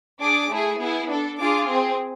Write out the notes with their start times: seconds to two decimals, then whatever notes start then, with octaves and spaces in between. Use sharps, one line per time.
0.21 D4 G#4 D6
0.50 A3 E4 G#4
0.79 B3 E4 G#4
1.09 D4 A4
1.38 D4 F4 G#4 D6
1.68 C4 G#4